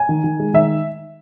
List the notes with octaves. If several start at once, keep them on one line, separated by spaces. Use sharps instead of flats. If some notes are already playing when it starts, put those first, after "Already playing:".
Already playing: G#5
D#3
D#3
G#3
D#3 E5